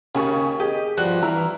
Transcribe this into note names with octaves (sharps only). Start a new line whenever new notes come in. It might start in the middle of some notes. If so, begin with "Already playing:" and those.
D#2 C#3 G#5 C#6
G4 G#4 D#5
G2 F3 F#4 F#6
E3 E4 A#5 F6